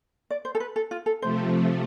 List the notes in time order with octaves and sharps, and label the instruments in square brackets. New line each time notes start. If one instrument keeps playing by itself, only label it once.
[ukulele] D5
C5
A4
B4
A4
F4
A4
[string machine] C3 F3 A3 [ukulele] C5